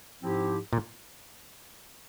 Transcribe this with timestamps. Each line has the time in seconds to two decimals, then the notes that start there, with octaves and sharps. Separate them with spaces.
0.22 G#2 F3 C4 E4 G4
0.73 A#2